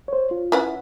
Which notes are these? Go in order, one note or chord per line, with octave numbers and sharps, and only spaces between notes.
C5 C#5
F4
C#4 E4 B4 E5 F#5